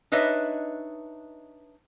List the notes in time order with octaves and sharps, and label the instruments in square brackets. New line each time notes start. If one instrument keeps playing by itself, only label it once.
[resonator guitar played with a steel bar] D4 D#4 B4 C#5 D#5 E5